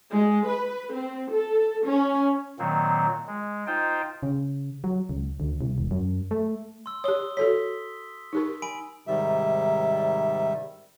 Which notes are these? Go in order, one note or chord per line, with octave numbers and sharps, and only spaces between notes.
G#3
B4
C4
A4
C#4
A#2 D#3 F#3 A#3 C4
G#3
D#4 F4 C5 G5
C#3
F#3
C#2
D2
C2
E1
F#2
A3
C6 E6
G4 C#5 D#6 G7
F#4 A4 C#5 B6
D#4 G4 A#4
G#5 B5 D7
G#2 C3 D#3 G3 E5